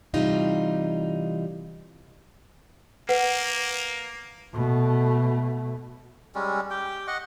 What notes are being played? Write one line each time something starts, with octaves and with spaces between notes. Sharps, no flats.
C3 E3 G3 D#4 F4
A#3 B4 F#5
B2 A3
G3 G#3 C#4
G4 G5
D#5 F#5 C#6